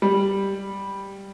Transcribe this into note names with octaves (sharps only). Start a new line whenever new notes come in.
G3